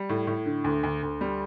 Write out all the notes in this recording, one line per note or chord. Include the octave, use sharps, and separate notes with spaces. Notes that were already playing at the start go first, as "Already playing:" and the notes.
Already playing: G3
A2
A2
D3
D2
D2
D2
G3